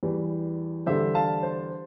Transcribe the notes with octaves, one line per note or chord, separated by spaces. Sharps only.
E2 E3 G3
E2 D3 G3 C5 E5
F5 A5
C5